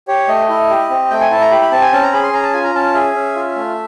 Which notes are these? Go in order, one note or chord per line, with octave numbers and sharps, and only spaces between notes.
G4 C#5
A3 D#5
E4
G4
C4
A3 G5
G#5
E4 A5
A#5
G4 B5
B5
C4 A5
G#5
C#4 A5
A#5
G#4 B5
C6
C#4 A#5
A5
F4 G#5
A#5
C#4 A5
G#4 E5
C#4
F4
A3